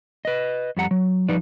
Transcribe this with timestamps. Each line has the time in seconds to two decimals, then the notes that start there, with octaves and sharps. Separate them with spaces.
0.25 B4 D#5
0.77 F2 G3 F#5 A#5
0.91 F#3
1.29 F3 G3 D#4 B4 D5